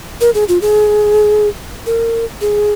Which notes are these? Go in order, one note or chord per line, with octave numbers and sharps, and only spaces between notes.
A#4
G#4
F4
G#4
A#4
G#4